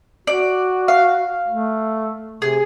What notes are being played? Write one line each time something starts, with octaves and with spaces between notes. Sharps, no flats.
F#4 D5
F5
A3
C3 G#4